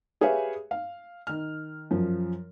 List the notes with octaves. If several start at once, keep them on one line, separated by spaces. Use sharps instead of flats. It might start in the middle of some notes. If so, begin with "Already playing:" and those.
G4 G#4 B4 C#5 E5 F5
F5
D#3 F6
F#2 F3